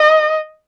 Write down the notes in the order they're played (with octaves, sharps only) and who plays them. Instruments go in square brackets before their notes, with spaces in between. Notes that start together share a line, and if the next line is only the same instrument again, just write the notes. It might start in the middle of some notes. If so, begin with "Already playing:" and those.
Already playing: [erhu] D#5